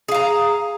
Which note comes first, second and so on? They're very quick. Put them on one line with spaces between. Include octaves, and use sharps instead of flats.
G#4 F5 A#5